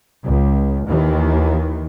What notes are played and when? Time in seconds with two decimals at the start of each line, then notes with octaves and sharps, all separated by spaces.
0.22 C#2
0.85 D#2 D#3 E3